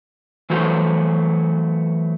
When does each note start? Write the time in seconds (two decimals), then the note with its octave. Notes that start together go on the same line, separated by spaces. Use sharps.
0.50 E3 F#3 A3 F#4 C5